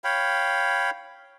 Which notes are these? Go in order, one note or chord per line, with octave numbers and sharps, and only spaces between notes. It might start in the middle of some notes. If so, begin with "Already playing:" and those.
C#5 F5 G5 B5